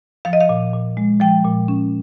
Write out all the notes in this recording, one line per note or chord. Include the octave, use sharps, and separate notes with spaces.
F3 F5
D#5
F5
A#2
A#2
G#3
F3 G5
A#2
C#4